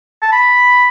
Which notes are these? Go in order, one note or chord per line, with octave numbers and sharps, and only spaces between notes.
A5
B5